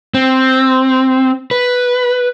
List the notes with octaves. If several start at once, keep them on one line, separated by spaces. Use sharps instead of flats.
C4
B4